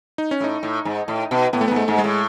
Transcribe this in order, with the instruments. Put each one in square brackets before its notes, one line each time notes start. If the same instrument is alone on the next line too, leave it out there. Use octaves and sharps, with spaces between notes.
[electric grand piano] D#4
C#4
[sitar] A2 [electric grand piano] D#4
[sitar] A2
G#2
A2
B2
[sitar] A2 [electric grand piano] B3
[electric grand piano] A3
B3
[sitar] G#2
[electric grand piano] A3
[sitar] G#2
[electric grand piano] G#3
[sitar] A2